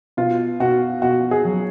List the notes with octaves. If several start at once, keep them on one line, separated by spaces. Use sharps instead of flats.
B2 F4
B2 F#4
B2 F#4
G#4
F#3